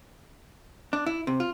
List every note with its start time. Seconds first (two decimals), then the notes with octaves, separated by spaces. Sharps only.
0.93 D4
1.06 E4
1.27 C3
1.40 F4